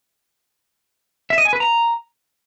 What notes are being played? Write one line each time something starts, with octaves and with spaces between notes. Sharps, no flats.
E5
D#5
G#5
B4
A#5